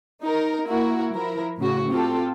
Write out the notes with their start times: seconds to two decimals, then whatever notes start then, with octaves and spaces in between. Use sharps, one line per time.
0.22 D#4 A#4
0.67 A#3 E4 F#4 A#4
1.13 F3 E4 A#4
1.58 A2 C#3 F#4
1.89 C4 F4 G4 A4